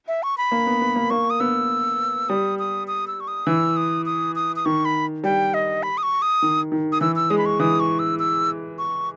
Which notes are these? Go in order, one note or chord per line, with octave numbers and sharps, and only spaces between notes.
E5
C#6
B5
A#3
B3
B3
A#3
A#3 C#6
D#6
B3 E6
G3 D#6
D#6
D#6
E6
C#6
D#6
E3 E6
D#6
D#6
D#6
D#6
D#3 C#6
B5
G3 G5
D#5
B5
D#6
C#6
D#6
D#3
D#3
D#6
E3 E6
E6
G#3 D#6
B5
C#6
E3 D#6
C#6
E6
E6
C#6